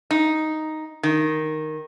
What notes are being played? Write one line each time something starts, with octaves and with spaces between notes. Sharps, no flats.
D#4
D#3